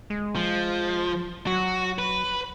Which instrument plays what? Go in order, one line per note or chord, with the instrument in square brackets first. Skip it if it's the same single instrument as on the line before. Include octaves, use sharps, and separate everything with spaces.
[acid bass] G#3
[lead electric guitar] F3
[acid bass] F#3 [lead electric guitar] F#4
[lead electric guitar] B4